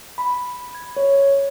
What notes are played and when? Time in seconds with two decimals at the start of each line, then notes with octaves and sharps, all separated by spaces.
0.18 B5
0.75 G#6
0.97 C#5